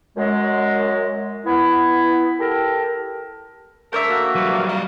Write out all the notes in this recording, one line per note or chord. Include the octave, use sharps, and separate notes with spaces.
F#2 G#3
B3 E4
G4 A4 A#4
D3 A3 A#4 C5 C#5 E5
A#3 F#4
D2 F#3 G3 B4
G2 F5
F#4 D#5 F5